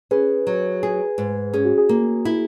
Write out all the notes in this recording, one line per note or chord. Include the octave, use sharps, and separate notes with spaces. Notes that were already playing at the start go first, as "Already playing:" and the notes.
C#4 G#4 B4
F#3
G#4
G#2
C#4 G#4
F#4
G#4
A#3
E4